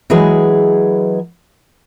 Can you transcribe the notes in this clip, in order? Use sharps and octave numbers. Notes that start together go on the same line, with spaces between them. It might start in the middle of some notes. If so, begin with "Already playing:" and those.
E3 F#3 G#3 G#4 B4